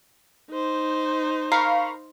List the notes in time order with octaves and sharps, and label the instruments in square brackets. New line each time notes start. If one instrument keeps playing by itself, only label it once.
[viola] D#4 C5
[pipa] A#4 [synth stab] F5 B5 C#6